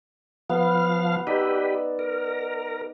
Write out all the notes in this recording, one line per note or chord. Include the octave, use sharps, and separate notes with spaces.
F3 B3 F5
D#4 G4 B4 D5 E6
A#4